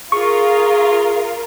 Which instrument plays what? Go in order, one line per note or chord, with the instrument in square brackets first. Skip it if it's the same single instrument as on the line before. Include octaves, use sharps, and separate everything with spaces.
[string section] F4 A#4 [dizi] G#4 [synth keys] C#6